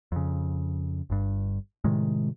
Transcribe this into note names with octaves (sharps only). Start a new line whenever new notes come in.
F2 C#3
G1 G2
A2 C3 D#3 G#3